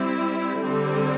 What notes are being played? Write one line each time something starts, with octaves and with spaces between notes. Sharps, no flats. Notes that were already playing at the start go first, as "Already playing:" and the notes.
Already playing: G3 C4 E4
D3 G3 C4